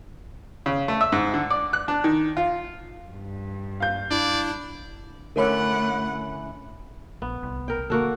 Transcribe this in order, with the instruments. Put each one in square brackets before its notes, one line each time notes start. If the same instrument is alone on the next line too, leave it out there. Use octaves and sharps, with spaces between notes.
[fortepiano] C#3
A3
E5
G#2
D3
D5
F#6
D4
D#3
F4
[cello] G2
[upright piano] F5 G6
[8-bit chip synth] D4 E4 [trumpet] D5
[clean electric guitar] D3 C#4 E4 [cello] A3 F#5 [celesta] A#4 C#5
[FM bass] A#1 [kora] B3
[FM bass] C2
[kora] A#4 G5
[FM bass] D3 [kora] A#3 F#4 A4